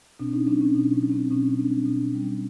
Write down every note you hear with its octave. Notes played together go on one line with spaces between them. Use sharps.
B2 C4 D4
C#4 D#4
F#3 C4 D4
C#4
B2 C#4
C#4
F#3
C4
B2 C#4
G3 C4 D4
B2
G3